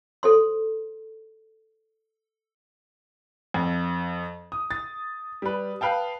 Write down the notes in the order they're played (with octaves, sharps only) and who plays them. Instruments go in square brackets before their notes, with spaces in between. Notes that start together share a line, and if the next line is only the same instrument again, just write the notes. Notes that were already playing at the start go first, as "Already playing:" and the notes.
[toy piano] A4 C5 C6
[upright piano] F2
D#6
A6
G3 B4
B4 F5 G5 A5